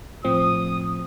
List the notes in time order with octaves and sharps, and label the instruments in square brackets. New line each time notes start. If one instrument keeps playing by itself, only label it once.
[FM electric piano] A2 F3 C4 [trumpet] D#6